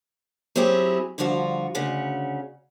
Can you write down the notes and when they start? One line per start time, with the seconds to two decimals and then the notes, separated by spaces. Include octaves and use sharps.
0.56 F#3 C4 C#4 E4 G4 G#4
1.18 G2 D3 F3 F4 F#4
1.75 D2 C#3 C#4 F#5